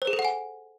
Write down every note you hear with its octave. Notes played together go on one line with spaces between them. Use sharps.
C5
G#4
A4
F#5
G#5